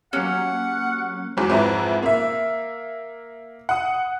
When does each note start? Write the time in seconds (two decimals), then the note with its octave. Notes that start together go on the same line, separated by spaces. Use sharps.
0.13 F#3 A#3 C#4 G4 F#5
1.37 E2 G#2 F#3
1.50 F2 G#2 E4 B4 A#5
2.03 A#3 E5
3.69 F#5 D#6